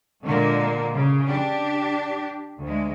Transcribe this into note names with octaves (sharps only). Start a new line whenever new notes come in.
A#2 D3 G#3 A#3
C#3
D4 G4
D2 G#3